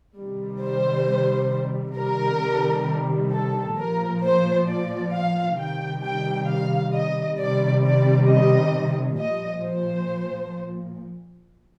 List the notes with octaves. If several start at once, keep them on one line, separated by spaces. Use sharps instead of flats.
C3 D#3 G3
C5
C3 D#3 G3 A#4
A4
A#2 F3 A#4
C5
D5
F5
C3 D#3 G3 G5
G5
F5
D#5
C3 D#3 G3 D5
D5
D#5
A#2 F3 D#5
C5